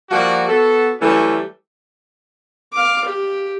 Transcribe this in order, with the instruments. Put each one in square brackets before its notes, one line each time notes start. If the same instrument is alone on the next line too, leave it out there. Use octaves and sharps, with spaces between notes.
[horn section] F3 G3 A#3 F#4
B3 F#4 A4
E3 F#3 G3 A3 C#4
[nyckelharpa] F5 D6
G4